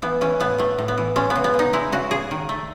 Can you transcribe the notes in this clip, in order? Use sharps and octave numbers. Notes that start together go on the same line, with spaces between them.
E3 B3
E3 C#4
A2 B3
A2 A3
A2
B3
E3
G#3 C#4
B3
C#3
B3
C#3
D#4
G#3 E4
C#3 F#4
C#3 G#4
D#3
A3